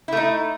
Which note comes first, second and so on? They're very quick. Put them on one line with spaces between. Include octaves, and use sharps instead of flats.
E4 A3 D#4